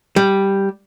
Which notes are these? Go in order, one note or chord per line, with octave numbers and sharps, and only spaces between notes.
G3